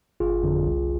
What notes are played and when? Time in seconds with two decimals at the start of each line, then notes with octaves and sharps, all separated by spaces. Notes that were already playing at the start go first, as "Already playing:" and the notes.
0.20 G1 F4 G#4
0.43 F2 D3
0.65 C2